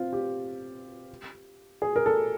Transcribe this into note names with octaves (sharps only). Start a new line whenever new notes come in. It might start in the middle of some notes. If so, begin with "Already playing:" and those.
Already playing: C4 F4
G4
G#4
A#4
A4